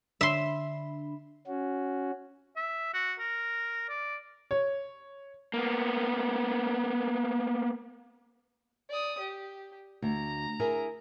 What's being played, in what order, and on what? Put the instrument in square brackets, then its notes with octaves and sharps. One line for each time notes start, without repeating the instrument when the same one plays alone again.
[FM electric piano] D3 D4 B5 [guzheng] E5 C6
[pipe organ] C#4 F#4
[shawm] E5
F#4
A#4
D5
[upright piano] C#5
[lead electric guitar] A#3 B3
[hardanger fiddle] D5 D#6
G4
[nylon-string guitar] D2 [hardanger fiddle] A#5
[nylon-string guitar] E4 G#4 A#4